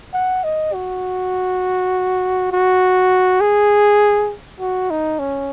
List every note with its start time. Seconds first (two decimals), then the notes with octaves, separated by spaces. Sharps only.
0.13 F#5
0.44 D#5
0.74 F#4
2.51 F#4
3.40 G#4
4.59 F#4
4.90 D#4
5.19 C#4